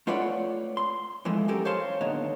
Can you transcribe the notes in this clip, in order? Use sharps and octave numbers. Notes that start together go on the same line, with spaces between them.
A3 F4 B4 C#5 D5 F#5
C6
F2 E3 G#3 A3
F#3 C#4 G4 A4 A#4
C5 C#5 F5 A5 C6
D#2 A#2 D3 B3 D#4 C#5